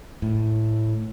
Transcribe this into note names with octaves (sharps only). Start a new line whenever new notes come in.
A2